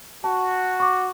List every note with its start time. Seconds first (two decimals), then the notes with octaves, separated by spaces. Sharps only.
0.24 F#4 A5
0.80 C#6 D6